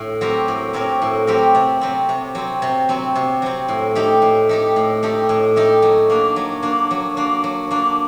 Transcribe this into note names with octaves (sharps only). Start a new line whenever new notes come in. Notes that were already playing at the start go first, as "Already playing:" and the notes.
Already playing: A2
F#3 C4 G4 A#4
A2
F#3 C4 G4 A#4
A2
F#3 C4 G4 A#4
C3
F#3 C4
C3
F#3 C4
C3
F#3 C4
C3
F#3 C4
A2
A3 D#4 G4
A2
A3 D#4 G4
A2
A3 D#4 G4
A2
A3 D#4 G4
F#3
A#3 D4
F#3
A#3 D4
F#3
A#3 D4
F#3
A#3 D4